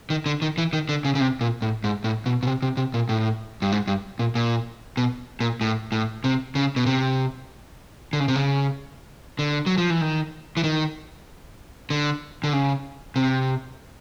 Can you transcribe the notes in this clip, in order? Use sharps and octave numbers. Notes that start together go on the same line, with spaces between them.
D#3
D3
D#3
E3
D#3
D3
C#3
C#3
C3
A#2
A2
G#2
A2
B2
B2
C3
C3
C3
A#2
A2
G2
G#2
G2
A#2
A#2
B2
A#2
A2
A2
C3
C#3
B2
C3
D3
C#3
C3
C#3
D3
F#3
F3
E3
D#3
E3
D#3
D3
D3
C#3
C3